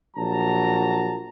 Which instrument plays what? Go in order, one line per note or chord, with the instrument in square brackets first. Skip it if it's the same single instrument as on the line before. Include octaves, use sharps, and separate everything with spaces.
[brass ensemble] A#1 F#3 A5 A#5